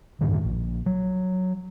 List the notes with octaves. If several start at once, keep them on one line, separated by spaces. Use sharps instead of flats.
F#2 A2 D3 D#3
A#1
F#3